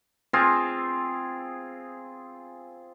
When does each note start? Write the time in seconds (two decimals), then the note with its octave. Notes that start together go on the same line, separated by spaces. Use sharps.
0.33 C4 F4 G#4